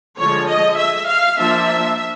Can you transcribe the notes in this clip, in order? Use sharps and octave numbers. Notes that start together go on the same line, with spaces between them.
D3 F3 G#3 C#5
D#5
E5
F5
F3 A#3 D4 E5